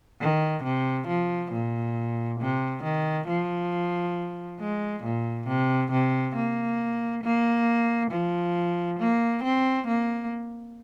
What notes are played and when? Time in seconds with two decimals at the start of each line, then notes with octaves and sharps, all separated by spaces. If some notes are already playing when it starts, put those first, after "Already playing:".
0.21 D#3
0.64 C3
1.08 F3
1.52 A#2
2.40 C3
2.83 D#3
3.28 F3
4.60 G#3
5.04 A#2
5.48 C3
5.92 C3
6.36 A#3
7.24 A#3
8.11 F3
9.00 A#3
9.44 C4
9.87 A#3